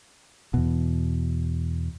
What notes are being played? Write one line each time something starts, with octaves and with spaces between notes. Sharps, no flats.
E2 B2